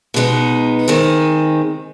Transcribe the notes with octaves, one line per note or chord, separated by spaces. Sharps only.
B2 G#3 B3 D#4
D#3 G#3 C4